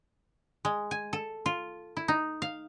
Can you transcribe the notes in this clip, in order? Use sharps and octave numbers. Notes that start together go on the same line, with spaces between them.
G#3
G#5
A4
F4
E4
D#4
F5